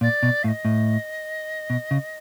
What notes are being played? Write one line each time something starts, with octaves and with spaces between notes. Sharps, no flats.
A#2 D5
B2
A2 F5
D#5
A2
B2
C#3